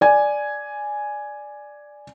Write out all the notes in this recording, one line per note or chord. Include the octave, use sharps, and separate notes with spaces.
D5 G#5